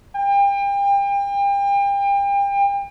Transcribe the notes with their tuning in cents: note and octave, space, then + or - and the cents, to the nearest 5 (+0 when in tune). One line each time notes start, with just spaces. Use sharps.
G5 +35